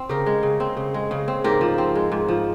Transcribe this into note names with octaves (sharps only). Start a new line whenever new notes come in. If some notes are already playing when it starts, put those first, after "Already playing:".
Already playing: C4
C#3 G4 A#4
G#3
C#3
C4
C#3
G#3
C#3
C4
G#2 G4 A#4
F3
C4
G#3
G#2
F3